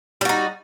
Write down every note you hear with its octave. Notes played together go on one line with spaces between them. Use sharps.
G3 D#4 F#4